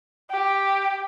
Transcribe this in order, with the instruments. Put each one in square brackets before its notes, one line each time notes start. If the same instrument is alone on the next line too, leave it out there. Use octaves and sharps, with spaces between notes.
[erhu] G4